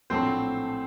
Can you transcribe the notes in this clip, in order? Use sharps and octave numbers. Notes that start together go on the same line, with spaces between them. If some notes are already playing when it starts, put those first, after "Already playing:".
A#1 A2 F#3 A3 C4 C5